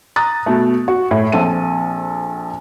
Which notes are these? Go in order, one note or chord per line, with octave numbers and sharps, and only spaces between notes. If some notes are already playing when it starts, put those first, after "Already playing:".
A#5 D#6 F#6 A6
B2 A3
F#4
A2
A#1 C4 A4 D#7